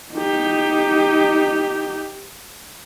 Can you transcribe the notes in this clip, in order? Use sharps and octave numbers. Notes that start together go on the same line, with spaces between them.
D#4 G4